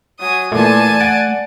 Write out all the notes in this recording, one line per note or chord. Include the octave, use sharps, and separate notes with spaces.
F#3 G#5 D#6
A#2 E3 A3 D5 G#5 A5
F#5 A6 D7